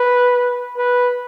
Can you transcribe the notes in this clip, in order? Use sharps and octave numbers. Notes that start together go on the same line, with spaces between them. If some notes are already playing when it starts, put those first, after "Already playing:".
Already playing: B4
B4